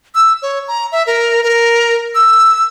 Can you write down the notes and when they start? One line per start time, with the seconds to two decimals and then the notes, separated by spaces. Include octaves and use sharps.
0.15 E6
0.42 C#5
0.68 A#5
0.92 E5
1.07 A#4
1.43 A#4
2.15 E6